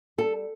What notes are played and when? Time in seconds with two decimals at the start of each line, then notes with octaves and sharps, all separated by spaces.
0.18 G3 A4